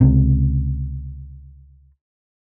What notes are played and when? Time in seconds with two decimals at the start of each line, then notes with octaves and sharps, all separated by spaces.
0.01 C#2 C3